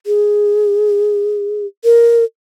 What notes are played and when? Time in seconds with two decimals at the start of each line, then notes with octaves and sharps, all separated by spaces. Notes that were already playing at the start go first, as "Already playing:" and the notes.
0.07 G#4
1.84 A#4